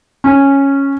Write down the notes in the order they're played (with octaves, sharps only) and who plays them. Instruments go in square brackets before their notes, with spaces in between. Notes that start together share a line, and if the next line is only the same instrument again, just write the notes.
[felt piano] C#4